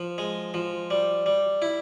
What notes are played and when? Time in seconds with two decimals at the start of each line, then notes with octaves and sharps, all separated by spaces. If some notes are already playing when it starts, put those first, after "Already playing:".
Already playing: F3
0.18 G#3
0.54 F3
0.90 G3
1.26 G3
1.62 E4